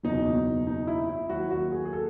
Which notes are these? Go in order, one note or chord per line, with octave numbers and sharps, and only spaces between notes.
F#1 E2 B2 F#3 D#4
D#4
E4
E4
D#2 D#3 F#3 F#4
F#4
G#4
G#4
A4